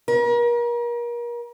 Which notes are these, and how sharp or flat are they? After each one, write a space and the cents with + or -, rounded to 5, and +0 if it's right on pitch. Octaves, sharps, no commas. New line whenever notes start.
A#4 +35